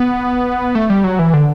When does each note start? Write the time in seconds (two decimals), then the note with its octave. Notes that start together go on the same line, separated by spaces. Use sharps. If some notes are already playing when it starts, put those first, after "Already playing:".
Already playing: B3
0.75 A3
0.90 G3
1.04 F#3
1.19 E3
1.33 D3